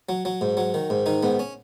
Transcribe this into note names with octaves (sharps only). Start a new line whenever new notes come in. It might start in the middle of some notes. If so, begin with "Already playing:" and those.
F#3
F#3
G#2
F#3
D#3
G#2
D#3 D#4
G#2 B3
C#4